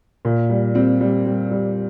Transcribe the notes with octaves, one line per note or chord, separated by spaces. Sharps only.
A#2
G3
G3 C4
G3
G3
G3